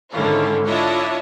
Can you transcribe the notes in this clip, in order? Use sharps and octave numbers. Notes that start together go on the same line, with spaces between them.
G#2 D3 D#3 C#4 E4 F4
D4 E4 F4 C#5 D#5 E5